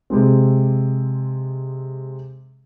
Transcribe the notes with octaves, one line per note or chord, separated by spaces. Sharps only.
C3 G#3 C4